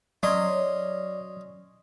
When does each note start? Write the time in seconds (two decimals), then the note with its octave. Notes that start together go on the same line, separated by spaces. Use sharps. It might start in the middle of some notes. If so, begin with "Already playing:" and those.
0.23 F#3 C#4 D5 D#5 C6